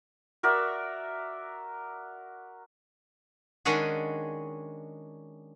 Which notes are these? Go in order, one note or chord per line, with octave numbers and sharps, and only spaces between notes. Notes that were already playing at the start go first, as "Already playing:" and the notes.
F#4 A#4 D5 E5
D#3 G#3 C#4 D4 F#4 G#4